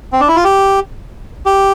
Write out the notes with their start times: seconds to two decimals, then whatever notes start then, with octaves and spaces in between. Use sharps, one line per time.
0.13 C4
0.20 D4
0.28 E4
0.36 F4
0.44 G4
1.46 G4